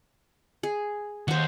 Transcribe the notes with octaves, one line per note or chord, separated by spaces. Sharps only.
G#4
D#2 C5 F#5